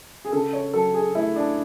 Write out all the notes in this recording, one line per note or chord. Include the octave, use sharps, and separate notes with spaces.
G#4
C#3 A4
C#5
F#3 A4
G#4
A3 E4
D4